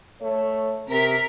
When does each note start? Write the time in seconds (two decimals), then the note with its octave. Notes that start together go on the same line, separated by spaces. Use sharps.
0.22 A3 A4 C#5
0.88 C3 A#4 B6